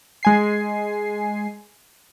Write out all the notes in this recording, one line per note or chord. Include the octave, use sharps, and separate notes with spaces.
G#3 G#5 C7